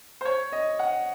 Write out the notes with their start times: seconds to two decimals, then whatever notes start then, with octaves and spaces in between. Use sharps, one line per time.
0.21 C5
0.25 C#5
0.52 D#5
0.79 F#5